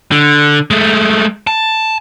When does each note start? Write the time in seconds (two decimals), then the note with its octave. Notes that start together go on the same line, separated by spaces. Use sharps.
0.11 D3
0.71 G#3 A3
1.47 A5